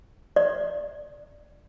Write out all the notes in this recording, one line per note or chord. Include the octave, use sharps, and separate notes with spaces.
D5